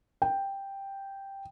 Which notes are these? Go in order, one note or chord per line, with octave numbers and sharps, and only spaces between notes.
G5